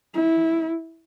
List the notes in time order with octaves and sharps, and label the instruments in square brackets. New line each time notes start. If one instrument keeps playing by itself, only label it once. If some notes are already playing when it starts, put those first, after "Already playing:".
[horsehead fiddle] E4